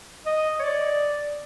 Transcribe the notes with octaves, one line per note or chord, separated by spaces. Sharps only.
D#5
C#5
D5